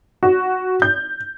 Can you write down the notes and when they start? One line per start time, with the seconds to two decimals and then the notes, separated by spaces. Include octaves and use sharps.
0.23 F#4
0.82 G6